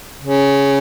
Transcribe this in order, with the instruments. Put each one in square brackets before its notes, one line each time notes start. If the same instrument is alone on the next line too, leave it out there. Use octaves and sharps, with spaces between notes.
[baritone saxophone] C#3